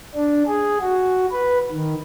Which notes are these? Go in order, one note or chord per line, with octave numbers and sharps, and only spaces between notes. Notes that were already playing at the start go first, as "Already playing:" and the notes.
D4
G#4
F#4
B4
D#3